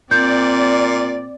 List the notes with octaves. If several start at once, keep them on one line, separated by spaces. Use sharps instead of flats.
A#2 C4 D5 G6